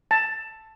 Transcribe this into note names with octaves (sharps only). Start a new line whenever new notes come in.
A5